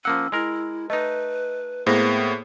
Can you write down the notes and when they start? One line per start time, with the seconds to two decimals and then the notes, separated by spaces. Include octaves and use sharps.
0.05 F3 A#3 C#4 F#5 E6
0.32 G#3 E4 A#4
0.90 A3 D#4 B4 D#5
1.86 A2 A#3 B3 G#4 C5 A#6